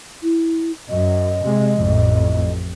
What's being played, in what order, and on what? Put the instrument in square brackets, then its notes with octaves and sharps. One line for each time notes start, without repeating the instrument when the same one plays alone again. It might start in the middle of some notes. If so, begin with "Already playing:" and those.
[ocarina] E4
[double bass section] F#2 [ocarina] D#5
[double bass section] C3 G#3
A1 F2 A2